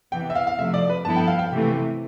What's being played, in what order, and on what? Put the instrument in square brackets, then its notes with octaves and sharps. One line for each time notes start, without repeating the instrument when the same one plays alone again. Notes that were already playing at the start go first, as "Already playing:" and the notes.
[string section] C3 E3 B3 [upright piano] G5
[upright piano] E5
F5
F5
[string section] C3 F3 A3 [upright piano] E5
[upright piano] D5
B4
[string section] G2 F3 B3 E4 A4 [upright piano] A5
[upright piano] G5
F5
G5
[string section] C3 E3 A3